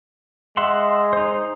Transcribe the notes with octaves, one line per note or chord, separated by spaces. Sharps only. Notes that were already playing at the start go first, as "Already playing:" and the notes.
G#3 E5 F#5 C6
D#4 C5